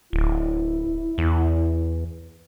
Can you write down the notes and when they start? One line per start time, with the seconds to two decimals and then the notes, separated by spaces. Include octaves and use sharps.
0.13 D1 E4
1.18 E2